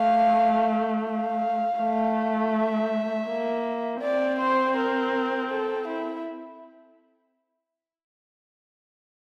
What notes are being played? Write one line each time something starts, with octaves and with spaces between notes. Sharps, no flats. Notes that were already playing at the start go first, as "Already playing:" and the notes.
Already playing: A3 F5
F5
A3
E5
A#3
C4 D5
C5
A#4
A4
E4